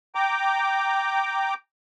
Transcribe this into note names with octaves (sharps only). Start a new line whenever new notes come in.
G5 A#5 D6